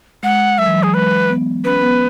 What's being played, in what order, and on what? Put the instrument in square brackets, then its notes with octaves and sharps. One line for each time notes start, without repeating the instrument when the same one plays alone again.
[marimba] G#3 [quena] F#5
[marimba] F#3 [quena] E5
[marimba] E3
F#3
[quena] G#4
[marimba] G#3 [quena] B4
[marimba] B3
[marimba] C#4 [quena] B4
[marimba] B3